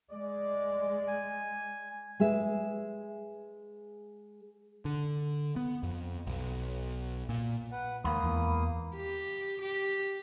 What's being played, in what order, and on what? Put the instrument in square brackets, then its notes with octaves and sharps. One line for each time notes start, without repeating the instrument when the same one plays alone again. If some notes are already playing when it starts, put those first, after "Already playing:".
[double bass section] G#3 [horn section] D5
[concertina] G#5
[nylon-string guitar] G#3 G#4 B4 E5
[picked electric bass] D3
B3
F2
B1
A#2
[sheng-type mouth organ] B4 F#5
[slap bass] D#2 [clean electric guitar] G#3 F#5 B5 [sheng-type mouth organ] A#3 D#6
[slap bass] E2
[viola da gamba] G4
G4